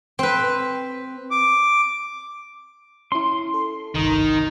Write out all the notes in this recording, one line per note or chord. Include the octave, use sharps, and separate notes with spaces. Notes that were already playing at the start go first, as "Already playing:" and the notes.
C4 B4
D6
C#4 E4 C6
A4
G1 C2 D#3 D#4 A#5 D#6